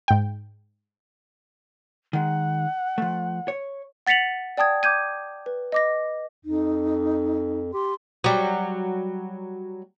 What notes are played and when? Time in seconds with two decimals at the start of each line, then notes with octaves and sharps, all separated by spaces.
0.08 G#2 G5
2.13 D#3 G#3 F#5
2.98 F3 A3
3.48 C#5
4.07 F#5 A6 B6 C#7 F7 F#7
4.57 D5 G5 A5 D#6 G#6
4.83 D6 G6 G#6 D#7
5.46 B4
5.72 D#5 D6 A#6
6.45 F2 D#4
7.74 G4 C6
8.24 F#3 G3